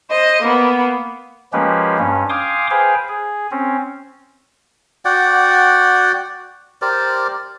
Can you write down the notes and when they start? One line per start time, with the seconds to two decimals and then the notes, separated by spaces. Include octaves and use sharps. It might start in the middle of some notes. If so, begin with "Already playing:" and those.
0.10 C5 D#5
0.43 A#3 B3
1.53 F3 G#3 A#3 C#4 G4 B4
1.99 G2 C#4
2.29 F5 G5 G#5 C6 D6 D#6
2.71 G#4 B4 C5 F5 G5 G#5
3.08 G#4
3.51 C4 C#4
5.05 F#4 D5 F#5 G5
6.82 G4 A#4 C5 D5